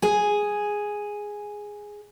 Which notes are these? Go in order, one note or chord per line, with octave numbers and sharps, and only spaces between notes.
G#4 G#5